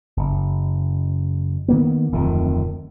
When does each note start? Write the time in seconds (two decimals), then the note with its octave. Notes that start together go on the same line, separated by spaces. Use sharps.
0.17 F#1
1.68 D#3 A#3 B3
2.12 D1 F2 D#3